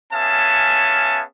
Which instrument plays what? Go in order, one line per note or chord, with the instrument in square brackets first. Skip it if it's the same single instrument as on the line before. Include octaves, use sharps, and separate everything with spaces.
[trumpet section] B3 C#4 G#4 E5 F5 A5